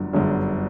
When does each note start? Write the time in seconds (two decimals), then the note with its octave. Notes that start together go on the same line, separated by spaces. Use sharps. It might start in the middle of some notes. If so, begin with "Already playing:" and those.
Already playing: G1 F#2 D3
0.13 G1 F#2 D3